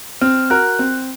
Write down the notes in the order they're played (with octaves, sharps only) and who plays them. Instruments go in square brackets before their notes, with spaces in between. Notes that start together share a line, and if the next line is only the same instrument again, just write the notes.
[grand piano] C4 [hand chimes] F6
[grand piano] F#4 A#4 [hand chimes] F#6
[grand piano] C4